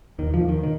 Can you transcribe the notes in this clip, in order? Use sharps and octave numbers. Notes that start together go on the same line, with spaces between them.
D#2 D#3
F3
D#2
D#3
D#3